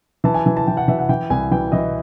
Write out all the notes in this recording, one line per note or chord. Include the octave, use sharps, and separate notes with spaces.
E3 A5
G#5
E3
A5
E3 G5
F#5
E3 E5
F#5
E3 G5
C2 G#5
E3 G5
E3 D#5